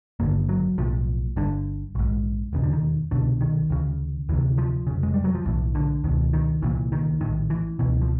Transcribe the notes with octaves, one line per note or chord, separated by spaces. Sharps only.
G#1 G2 D3 A#3
F#3
B1 A2 F3
G1 G2 D3
A#1 G#2
E1 D#2 C#3
D3
D#3
C2 B2 D3
D#3
D2 C#3
D2 C3 E3
F3
F1 D#2 C#3
G#3
G3
F#3
F3
B1 A2 E3
D3
C#2 B2 D#3
D#3
C2 A#2 E3
D#3
A#1 A2 D#3
E3
C#2 B2 E3
F3